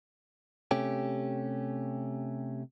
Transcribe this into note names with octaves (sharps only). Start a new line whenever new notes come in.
C3 A3 C#4 G4